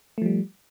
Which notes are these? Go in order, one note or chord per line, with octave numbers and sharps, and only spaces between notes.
F3 G3 A3